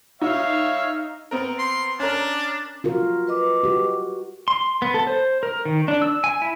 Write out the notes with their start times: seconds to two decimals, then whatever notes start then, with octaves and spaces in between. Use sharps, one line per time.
0.21 D#4 C#5 E5 F5
1.31 B3 C4 A#4
1.59 C6
2.00 C#4 D4 A#4
2.84 F4 F#4 A#4
3.27 B4 D#5 D6
3.64 F#4 G4
4.48 C6
4.82 B3
4.94 A4
5.07 C5
5.43 A#4
5.65 D#3
5.88 D4
6.02 E6
6.24 G#5
6.42 E4